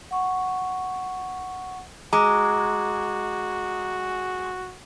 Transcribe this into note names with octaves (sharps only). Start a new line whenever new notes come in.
F#5 C#6
G#3 F#4 A#5 D6